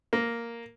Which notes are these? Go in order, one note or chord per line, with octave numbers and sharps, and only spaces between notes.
A#3